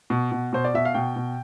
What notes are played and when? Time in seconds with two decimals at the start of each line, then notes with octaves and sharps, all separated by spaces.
0.10 B2
0.32 B2
0.53 B2 C5
0.64 D5
0.74 B2 E5
0.85 F5
0.94 B2 G5
1.16 B2